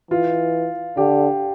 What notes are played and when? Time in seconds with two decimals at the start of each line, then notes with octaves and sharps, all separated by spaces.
0.10 E3 F4
0.97 D3 G4